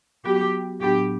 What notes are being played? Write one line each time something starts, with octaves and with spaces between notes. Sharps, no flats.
F#3 B3 F#4 G4
A2 F#3 B3 D4 G4